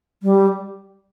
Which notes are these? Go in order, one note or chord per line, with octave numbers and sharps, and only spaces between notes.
G3